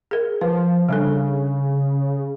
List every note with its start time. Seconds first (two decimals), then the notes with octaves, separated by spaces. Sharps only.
0.11 G#4 A#4
0.41 F3 B4
0.89 C#3 G3 D4 A4